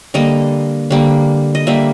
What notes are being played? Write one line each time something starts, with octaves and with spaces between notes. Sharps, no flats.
D3 G3 A#3 D#5
D3 G3 A#3
D#5
D3 G3 A#3 E5